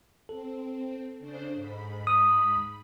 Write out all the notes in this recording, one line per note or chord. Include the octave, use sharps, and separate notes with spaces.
C4 A4
C#3 D4 C5
G#2 B5
D#6